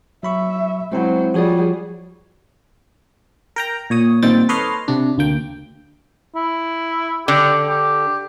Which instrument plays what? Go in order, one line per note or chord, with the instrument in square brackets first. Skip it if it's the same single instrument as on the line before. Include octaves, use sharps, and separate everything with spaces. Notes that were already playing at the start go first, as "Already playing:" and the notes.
[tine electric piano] F#3 B5 C#6 [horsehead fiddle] E5
[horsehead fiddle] F#3 C5 [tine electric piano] G#3 C4 E4
[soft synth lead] F3 [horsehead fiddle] G3 G#4 [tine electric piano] F#4 C#5 D5
[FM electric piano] A#4 G5 A#5
A#2 C#5 D#6
A#2 D#3 G3 C4 G5 A6
A4 B4 C#5 D#5 C6 F6
C3 D4
D2 A#3 G5
[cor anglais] E4
[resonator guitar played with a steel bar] D3 [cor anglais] G4
[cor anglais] G4